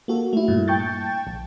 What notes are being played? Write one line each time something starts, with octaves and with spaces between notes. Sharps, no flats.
A#3 F#4 A4
A3 E4
G2 A#2
G5 A5 C#6 G6 A6
A#1